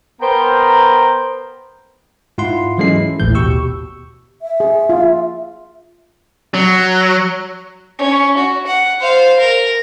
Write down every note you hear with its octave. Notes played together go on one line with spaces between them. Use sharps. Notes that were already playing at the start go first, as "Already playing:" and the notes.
B3 A#4 C5 G5 A#5
G#2 E4 F4 F#5 C6
E3 F#3 G#3 C#4 A4 C7
E4
A1 D#2 A2 E3 G6
D#2 B2 G4 C#6 E6
E5
G#4
F4
F#3
C#4
F#4
F#5
C5 F5
A#4